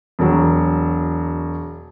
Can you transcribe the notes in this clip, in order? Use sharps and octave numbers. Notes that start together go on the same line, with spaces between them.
E1 F#3